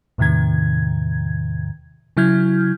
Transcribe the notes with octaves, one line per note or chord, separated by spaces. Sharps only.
E2 A2 C3 D#3 G#6
C#3 F#3 E4 F6 G6 G#6